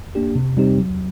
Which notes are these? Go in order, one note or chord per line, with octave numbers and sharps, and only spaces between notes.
A#3 D4 G4
C3
G3 C4 D#4 G4
F#3